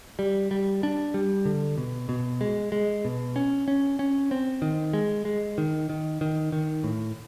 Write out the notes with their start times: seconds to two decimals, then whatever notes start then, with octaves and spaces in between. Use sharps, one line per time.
0.19 G3
0.51 G3
0.83 D4
1.14 G3
1.45 D3
1.78 B2
2.09 B2
2.41 G#3
2.72 G#3
3.05 B2
3.36 C#4
3.68 C#4
3.99 C#4
4.31 C4
4.62 D#3
4.93 G#3
5.25 G#3
5.58 D#3
5.89 D#3
6.21 D#3
6.52 D#3
6.84 A2